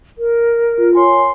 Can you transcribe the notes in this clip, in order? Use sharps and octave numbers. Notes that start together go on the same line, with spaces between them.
A#4
F4
C#5 G#5 C6